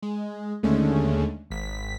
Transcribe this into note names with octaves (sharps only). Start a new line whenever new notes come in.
G#3
D#2 D3 G#3 A3 C#4
G#1 B6